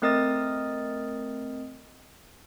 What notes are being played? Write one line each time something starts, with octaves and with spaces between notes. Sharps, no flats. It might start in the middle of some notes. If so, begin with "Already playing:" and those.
A3 C4 A#4 D#5 D#6 A6